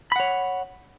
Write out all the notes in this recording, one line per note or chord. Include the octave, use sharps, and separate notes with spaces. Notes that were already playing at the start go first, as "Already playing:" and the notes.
C#5 F#5 B5